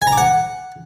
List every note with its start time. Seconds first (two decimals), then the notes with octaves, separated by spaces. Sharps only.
0.02 G#5
0.07 A#5
0.12 D6
0.18 F#5